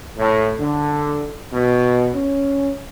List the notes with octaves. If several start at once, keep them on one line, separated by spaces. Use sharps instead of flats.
A2
D3
B2
C#4